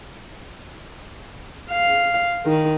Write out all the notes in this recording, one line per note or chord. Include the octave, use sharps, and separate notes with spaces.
F5
D#3